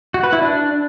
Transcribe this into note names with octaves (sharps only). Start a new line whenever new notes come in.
F#4
B4
E4
D4